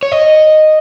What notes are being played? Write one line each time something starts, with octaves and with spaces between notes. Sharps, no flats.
C#5
D#5